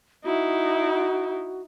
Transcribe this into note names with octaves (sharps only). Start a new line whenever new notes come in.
D#4 E4 F#4